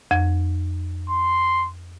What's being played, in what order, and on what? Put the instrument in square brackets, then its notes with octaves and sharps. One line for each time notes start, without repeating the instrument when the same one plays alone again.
[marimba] F2
[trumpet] C6